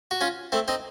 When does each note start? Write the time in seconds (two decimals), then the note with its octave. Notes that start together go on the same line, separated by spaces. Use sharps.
0.11 F#4
0.21 C#4 F4
0.52 A3 C4
0.68 C4 D#4